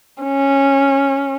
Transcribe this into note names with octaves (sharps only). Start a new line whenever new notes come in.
C#4